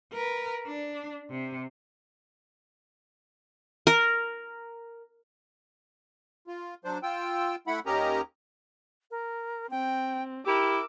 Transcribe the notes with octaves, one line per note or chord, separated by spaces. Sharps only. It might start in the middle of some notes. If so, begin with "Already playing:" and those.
A#4 B4
D4
C3
A#4
F4
F#3 D4 C5
F4 G5 E6
A3 E4 F#5 B5
D#2 C#4 G4 A#4 D#5 A#5
A#4
C4 G5
E4 G4 A#4 D6 E6